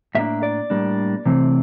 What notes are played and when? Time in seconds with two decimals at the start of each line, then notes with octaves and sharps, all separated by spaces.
0.15 A2 G3 A#3 D4 E5
0.43 D5
0.70 A2 G3 A#3 D4
1.26 C3 E3 A3 C4